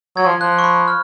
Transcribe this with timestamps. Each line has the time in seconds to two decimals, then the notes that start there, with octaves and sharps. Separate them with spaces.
0.17 F#3 G#6
0.25 F3
0.41 F3 F#6
0.59 C#6
0.64 B5
0.88 F6